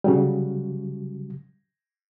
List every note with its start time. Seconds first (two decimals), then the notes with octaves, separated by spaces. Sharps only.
0.04 C#3 F#3 G3